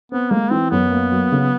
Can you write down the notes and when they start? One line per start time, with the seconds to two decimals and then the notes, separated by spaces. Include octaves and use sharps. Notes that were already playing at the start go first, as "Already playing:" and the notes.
0.12 B3 C4
0.31 G#3 A#3
0.51 E3 C4
0.71 F#2 B3
0.91 A#3
1.12 F#3
1.32 C#3